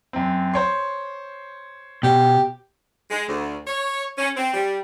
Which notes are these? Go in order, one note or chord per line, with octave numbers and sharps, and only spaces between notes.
F#2 C4
C5 C#5 C6
B2 G4
G#3
D2
C#5
C#4
C4
G3